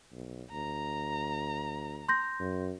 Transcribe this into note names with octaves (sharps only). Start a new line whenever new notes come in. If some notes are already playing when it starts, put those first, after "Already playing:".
B1
D2 A#5
C6 G6 A#6
F#2